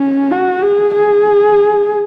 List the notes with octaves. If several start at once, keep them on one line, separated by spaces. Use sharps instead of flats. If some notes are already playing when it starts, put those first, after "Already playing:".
Already playing: C#4
F#4
G#4
G#4